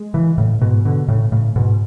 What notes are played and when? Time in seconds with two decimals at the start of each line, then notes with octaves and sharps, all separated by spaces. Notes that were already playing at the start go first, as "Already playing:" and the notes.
Already playing: G#3
0.14 C#3 E3
0.38 A2 C#3
0.61 G#2 B2
0.85 B2 D3
1.08 A2 C#3
1.32 A2 C#3
1.56 G#2 B2